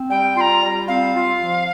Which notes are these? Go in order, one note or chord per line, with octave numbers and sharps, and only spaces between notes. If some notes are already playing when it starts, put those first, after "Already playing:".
Already playing: C4
G3 G5
F4 A#5 C6
G3
C4 F5
F4
F3